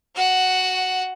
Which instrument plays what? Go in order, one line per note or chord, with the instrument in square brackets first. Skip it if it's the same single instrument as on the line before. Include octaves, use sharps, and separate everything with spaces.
[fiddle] F#4 F#5